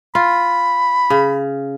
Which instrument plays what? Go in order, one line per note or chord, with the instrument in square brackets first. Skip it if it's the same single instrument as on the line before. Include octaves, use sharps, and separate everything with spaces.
[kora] F4 [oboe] B5
[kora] C#3